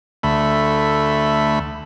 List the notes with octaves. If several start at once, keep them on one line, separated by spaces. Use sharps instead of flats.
D2 A3 B5